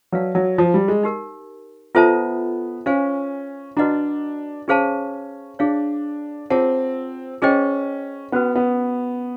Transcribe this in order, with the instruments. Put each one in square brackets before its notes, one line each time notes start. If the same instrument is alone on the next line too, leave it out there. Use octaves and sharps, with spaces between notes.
[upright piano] F#3 [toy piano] B4 D5 F5 A5
[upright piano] F#3
F3
G3
G#3
[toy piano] D#4 G4 A#4
[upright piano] B3 [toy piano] F4 A4 C5 E5 A5
[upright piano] C#4 [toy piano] C5 F5 G#5
[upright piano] D4 [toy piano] F#4 B4 D#5 F#5 A#5
[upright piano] C#4 [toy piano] G#4 C5 F5 A5
[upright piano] D4 [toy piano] G#4 C#5 F5
[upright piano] C4 [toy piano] F4 G#4 C#5 F#5 A5
[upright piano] C#4 [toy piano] G#4 C5 D#5 G5
[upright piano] B3 [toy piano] C#4 F#4 B4
[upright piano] B3